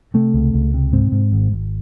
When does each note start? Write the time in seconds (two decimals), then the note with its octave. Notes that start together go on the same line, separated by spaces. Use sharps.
0.14 C3 A3
0.34 C#2
0.54 C#2
0.74 C3
0.93 G#2 C4
1.12 G#2
1.32 G#1
1.52 G#1